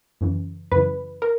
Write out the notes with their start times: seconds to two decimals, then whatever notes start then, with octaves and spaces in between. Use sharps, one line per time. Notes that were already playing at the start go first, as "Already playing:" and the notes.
0.21 F#2 C#3 E3
0.72 F#2 C#3 E3 B4
1.22 A#4